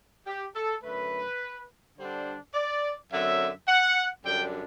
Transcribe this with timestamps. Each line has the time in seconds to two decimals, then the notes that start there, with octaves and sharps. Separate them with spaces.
0.27 G4
0.56 A4
0.84 F#2 D3 A3 B4
1.97 D3 G3 D4 C5
2.54 D5
3.11 F#2 D3 F#3 C4 E5
3.68 F#5
4.24 F#2 D3 G3 D4 G5